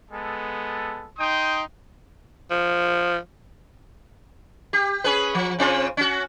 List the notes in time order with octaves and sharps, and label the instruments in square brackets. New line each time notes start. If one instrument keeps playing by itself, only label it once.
[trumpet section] G#3 B3 A4
D#4 G5 C6 D#6
[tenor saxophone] F3
[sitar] G4
C#4 G#4 B4
F3
C#3 C4 F4
C#4 F#4